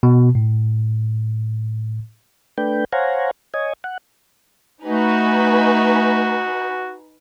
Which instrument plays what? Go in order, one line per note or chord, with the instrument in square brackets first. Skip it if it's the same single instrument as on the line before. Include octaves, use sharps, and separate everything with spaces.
[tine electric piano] B2
A2
[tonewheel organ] A3 D4 B4 G5
C5 C#5 F5 F#5 G#5 A#5
C#5 D#5 G#5
F#5
[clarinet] A3 [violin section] D#4 B4 G#5 [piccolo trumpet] F#4